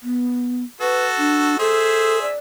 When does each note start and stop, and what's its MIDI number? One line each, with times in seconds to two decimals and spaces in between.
0.03 0.63 59
0.81 1.58 66
0.81 1.58 69
0.81 1.06 71
1.18 1.56 62
1.59 2.33 68
1.59 2.19 69
1.59 2.33 72
1.59 2.33 76
2.22 2.38 74